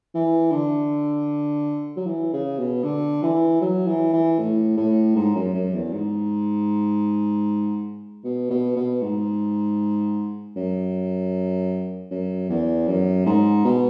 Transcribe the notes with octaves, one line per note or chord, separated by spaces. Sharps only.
E3
D3
F#3
E3
C#3
B2
D3
E3
F#3
E3
E3
A2
A2
G#2
F#2
F#2
E2
G#2
B2
B2
B2
G#2
F#2
F#2
E2
F#2
G#2
B2